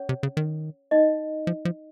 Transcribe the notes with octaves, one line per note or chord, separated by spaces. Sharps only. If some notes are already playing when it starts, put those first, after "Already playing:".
Already playing: C#4 C#5
C3
C#3
D#3
D#4 D#5
F3
F3